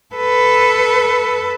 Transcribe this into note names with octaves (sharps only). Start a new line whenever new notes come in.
A4 B4